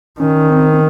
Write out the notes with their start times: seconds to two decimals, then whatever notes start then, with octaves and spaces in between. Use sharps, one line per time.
0.19 D#3 C#4
0.50 C4
0.73 C4